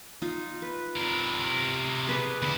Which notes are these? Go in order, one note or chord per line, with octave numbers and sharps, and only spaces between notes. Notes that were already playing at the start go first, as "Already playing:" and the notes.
D#4 F4
B4
C3 A#4
G#4 B4 D5
D2 E4 B5